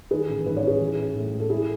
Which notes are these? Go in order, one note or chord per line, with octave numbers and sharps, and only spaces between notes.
D#3 G#4 B4
A1
G#2 B4
C#5
A1 G#4 B4
E3
A1
A2
G#3
A4
G#3 E4 G#4